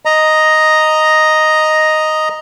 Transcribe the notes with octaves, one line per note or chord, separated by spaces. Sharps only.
D#5 A#5